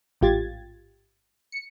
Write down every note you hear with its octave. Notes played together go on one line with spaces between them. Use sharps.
A1 G#2 F4 G4 G#6 A6
C#7